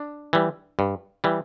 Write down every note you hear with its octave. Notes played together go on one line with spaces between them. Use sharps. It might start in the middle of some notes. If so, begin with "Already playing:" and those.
Already playing: D4
E3 G3
G2
E3 G3